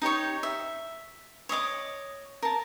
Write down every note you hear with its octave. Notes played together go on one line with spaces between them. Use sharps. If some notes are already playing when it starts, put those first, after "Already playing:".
D#4 G4 C#5 C#6
E5
C#5 D#5 E5 D6
A#4 A5